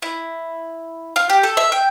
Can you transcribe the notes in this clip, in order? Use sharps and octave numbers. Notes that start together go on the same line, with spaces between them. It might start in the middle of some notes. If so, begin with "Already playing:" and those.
E4
F4
G4
A4
E5
G5